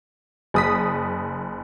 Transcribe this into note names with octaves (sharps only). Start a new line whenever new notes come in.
F#1 D#6 B6